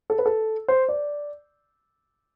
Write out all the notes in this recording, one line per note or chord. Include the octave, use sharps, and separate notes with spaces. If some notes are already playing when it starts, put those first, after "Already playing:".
A4
B4
A4
C5
D5